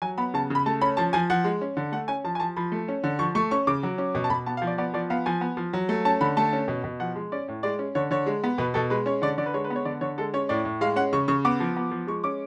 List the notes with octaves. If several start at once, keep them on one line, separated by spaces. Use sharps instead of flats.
F#3 G#5
B3 B5
C#3 A5
C#3 B5
A3 A5
C#4 B5
F3 A5
F3 G#5
F3 F#5
G#3
C#4
D3
A3 F#5
C#4 G#5
F3 A5
G#5
F3 A5
F3 B5
A3
C#4
D3
F3 C#6
A3 C#6
C#4 C#6
C#3 D6
F#3
C#4
B2 C#6
A5
B2 B5
B3 A5
F5
F3
D5
B3 D5
F3 D5
B3 F5
F3 G#5
B3
F3
F#3
A3
C#4 A5
D3 B5
A3 A5
C#4
B2
B2
F3 F#5
G#3
C#4 D5
A2
G#3 D5
C#4
D3 C#5
D3 C#5
G#3
B3
B2 B4
B2 A4
G#3 B4
C#4 C#5
D3 D5
D3 D5
B4
G#3 C#5
B4
B3
C#5
D3 D5
D3 C#5
G#3 A4
C#4 C#5
A2 D5
A2
G#3 F5
C#4 F#5
C#3 C#6
C#3 C#6
B3 D6
F3
B3
F3
G#3 C#6
C#4 D6